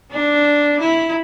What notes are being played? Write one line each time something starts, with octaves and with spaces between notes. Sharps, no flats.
D4
E4